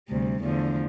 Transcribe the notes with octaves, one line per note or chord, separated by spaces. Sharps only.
D2 C3 G3
E2 D3 F3 A3